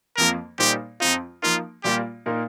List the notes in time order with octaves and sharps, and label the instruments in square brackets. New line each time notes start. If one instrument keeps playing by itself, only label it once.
[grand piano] F2 F3 A#3 [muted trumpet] A#4
[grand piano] A#2 G3 A#3 D#4 C5 [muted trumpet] G4
[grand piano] F2 F3 C4 F4 [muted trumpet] D#4
[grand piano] F3 A#3 D#4 A#4 [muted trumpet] F4
[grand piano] A#2 G3 A#3 F4 [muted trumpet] G4
[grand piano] A#2 A#3 D#4 A#4